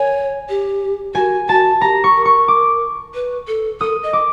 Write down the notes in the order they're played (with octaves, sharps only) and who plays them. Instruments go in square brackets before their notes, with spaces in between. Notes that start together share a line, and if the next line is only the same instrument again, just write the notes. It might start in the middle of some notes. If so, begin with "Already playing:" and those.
Already playing: [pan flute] C#5 [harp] G#5
[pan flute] G4
[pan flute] F#4 [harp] G#5
[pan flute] F#4 [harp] A5
[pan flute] G4 [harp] A#5
[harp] C#6
[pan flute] A#4
[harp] C#6
D6
[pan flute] B4
A4
[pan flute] A4 [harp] D#6
[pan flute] D#5
[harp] D6